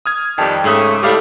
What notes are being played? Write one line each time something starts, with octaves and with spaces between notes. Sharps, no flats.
D#6 F6 G#6
F2 D#3 G3 G5 A5
G#2 C#3 A3 D#6
A2 G3 G4 A4 F5